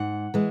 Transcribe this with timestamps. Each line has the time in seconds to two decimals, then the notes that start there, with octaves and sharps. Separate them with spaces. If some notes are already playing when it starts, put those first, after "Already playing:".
Already playing: G#2 F#5
0.34 E3 G#3